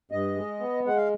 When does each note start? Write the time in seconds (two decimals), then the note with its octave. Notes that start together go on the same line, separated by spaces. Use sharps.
0.12 G2 D#5
0.36 G#3
0.60 B3
0.85 G#3 F#5
0.97 F5